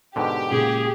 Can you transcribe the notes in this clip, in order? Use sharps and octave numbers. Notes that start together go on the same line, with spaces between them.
G#2 B2 D3 G4
A#2 C#3 G#3 G#4